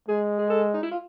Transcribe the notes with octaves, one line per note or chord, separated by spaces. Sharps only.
G#3 G#4
G#4
A4
D#4
E4
F4